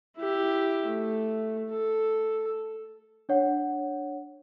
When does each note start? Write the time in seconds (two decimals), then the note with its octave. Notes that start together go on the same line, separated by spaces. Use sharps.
0.17 E4 G4
0.86 A3
1.70 A4
3.29 D4 C#5 F#5